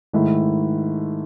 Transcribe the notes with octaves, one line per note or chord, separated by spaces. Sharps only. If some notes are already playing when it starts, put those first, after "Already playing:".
G#2 D#3 A3 E4